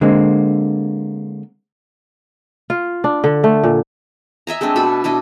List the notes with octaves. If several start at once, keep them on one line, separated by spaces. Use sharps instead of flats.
D3 G#3 A#3 C4
F4
D4
D3
A3
A#2
D#5 E5 G#5 A#5
G#3 A3 C4 D4
B2 A4 B5
B2 D4 E4 D#5